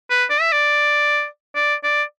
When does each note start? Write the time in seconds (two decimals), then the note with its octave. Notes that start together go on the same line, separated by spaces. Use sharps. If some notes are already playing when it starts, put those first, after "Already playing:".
0.10 B4
0.30 D5
0.41 E5
0.52 D5
1.55 D5
1.84 D5